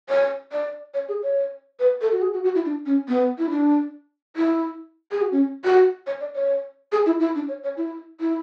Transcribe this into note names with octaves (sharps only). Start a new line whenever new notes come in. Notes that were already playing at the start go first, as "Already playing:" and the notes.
C#5
D5
C#5
G#4
C#5
B4
A4
F#4
G#4
F#4
F#4
E4
D4
C#4
B3
E4
D4
E4
G#4
F#4
C#4
F#4
C#5
D5
C#5
G#4
E4
E4
D4
C#5
C#5
E4
E4